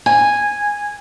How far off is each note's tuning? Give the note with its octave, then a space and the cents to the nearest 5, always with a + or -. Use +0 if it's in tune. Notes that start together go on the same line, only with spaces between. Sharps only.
G#5 -10